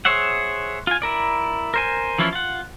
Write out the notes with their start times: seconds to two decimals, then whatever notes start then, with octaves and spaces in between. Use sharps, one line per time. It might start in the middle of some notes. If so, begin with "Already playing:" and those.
0.05 G#4 C5 C#5 E5 F#5
0.87 F4 G#5
1.02 E4 A#4 D5
1.74 A#4 C5 G#5
2.18 E3 F3 C#4 E4 F4
2.33 F4 F#5